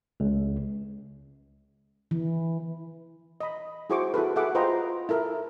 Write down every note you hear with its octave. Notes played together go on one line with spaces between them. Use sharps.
C#2
E3
D#5 B5
E4 F#4 G#4 C5 C#6 D6
E4 F#4 A4 B4
G#4 A4 E5 F#5 D6
F4 B4 C5 D#5 G5 A#5
E4 A4 A#4 E5